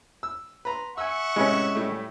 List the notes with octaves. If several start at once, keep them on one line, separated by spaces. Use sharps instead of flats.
E6
B4 A#5 C6
E5 F#5 G#5 C#6 E6
A2 C3 G#3 C#4 B4
A2 G3 A3